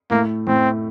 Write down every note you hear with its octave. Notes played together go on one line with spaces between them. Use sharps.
A2 A3 A#3
A2 A3 C4